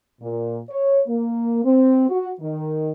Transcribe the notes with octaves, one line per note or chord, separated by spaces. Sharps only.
A#2
C#5
A#3
C4
F#4
D#3